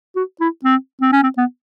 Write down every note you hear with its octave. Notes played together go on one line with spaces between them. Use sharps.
F#4
E4
C4
C4
C#4
C4
B3